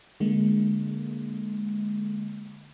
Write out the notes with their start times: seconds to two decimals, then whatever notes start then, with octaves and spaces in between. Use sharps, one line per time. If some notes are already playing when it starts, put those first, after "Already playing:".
0.20 D3 G#3 A#3